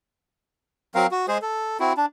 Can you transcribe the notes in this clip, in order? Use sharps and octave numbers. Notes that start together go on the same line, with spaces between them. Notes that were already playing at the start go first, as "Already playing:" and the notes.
F#3 C4 A#4 F5
F#4
G#3 G#4 C5
A4
C4 E4 F#4
D4